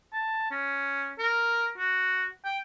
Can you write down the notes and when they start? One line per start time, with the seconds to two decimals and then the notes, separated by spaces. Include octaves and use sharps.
0.13 A5
0.51 C#4
1.19 A#4
1.78 F#4
2.45 G5